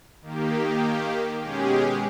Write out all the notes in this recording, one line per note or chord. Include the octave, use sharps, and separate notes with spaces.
D#3 A#3 G4
B2 G#3 C#4 G4 G#4